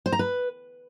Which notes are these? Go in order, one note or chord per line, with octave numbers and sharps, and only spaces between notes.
C5
A#5
B4